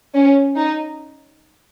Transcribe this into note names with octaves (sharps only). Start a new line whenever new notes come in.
C#4
D#4